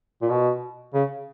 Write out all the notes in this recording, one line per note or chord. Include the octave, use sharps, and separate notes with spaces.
A#2
B2
C#3